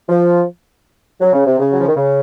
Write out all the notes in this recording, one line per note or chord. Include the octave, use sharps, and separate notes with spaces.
F3
F#3
C#3
C3
C#3
F#3
F3
D#3
C#3